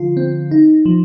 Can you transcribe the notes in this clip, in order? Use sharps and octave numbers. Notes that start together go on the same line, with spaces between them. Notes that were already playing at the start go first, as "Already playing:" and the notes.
Already playing: D3 F3 F4
C4
D#4
F3